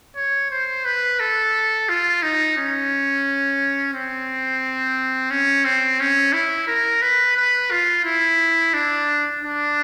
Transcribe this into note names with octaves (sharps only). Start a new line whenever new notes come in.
C#5
C5
B4
A4
F4
D#4
C#4
C4
C#4
C4
C#4
E4
A#4
B4
B4
F4
E4
D4
D4